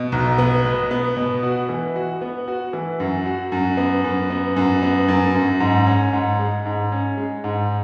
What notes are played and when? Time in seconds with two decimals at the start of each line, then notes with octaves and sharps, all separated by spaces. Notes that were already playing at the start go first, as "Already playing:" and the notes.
Already playing: B2
0.12 B1
0.38 B3
0.65 B2
0.91 B3
1.17 B2
1.43 F#4
1.69 E3
1.96 F#4
2.21 B3
2.48 F#4
2.73 E3
3.00 F#2
3.26 F#4
3.52 F#2
3.77 B3
4.04 F#2
4.30 B3
4.56 F#2
4.83 B3
5.08 F#2
5.35 F#2
5.60 G#2
5.86 C#4
6.13 G#2
6.39 G#3
6.66 G#2
6.92 C#4
7.17 G#3
7.44 G#2